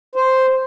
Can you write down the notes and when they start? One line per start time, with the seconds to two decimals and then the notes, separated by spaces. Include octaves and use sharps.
0.15 C5